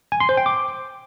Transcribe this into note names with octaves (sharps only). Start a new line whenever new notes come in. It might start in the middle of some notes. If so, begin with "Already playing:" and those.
G#5
C6
C5
G5
D6